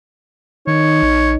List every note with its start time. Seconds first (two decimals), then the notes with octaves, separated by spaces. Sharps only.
0.67 D#3 D#4 C#5
1.02 A#1